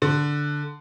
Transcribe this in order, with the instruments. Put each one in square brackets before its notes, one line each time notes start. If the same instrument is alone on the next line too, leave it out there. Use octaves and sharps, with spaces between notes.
[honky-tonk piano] D3